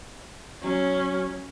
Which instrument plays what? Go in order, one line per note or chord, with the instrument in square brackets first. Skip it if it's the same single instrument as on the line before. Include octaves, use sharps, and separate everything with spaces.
[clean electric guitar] F#3 [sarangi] C#4